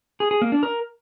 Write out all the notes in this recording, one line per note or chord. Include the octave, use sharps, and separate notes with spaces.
G#4
G#4
A#3
D4
A#4